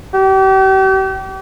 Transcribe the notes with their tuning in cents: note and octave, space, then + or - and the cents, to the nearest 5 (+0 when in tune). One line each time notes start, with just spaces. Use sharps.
G4 -40